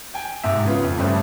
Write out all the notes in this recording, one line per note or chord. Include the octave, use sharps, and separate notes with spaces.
G5 G#5
G#2 C3 E5
C#3 B3 F4
F2
G2 C#3 G3 A3 C4 D4